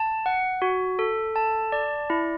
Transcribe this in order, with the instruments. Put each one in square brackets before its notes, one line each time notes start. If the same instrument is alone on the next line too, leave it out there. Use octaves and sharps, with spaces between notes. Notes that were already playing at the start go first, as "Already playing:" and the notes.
Already playing: [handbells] A5
F#5
F#4
A4
A5
D5
E4